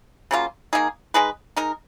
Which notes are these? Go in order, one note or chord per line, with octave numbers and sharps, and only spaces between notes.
C#3 F#3 A#3 F4
D#3 A#3 D#4 G#4
G#3 D#4 G#4 B4
G#3 D#4 A#4